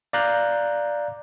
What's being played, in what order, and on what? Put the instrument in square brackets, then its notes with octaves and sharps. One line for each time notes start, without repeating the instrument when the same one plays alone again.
[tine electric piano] D5 F5 A#5 F#6 G6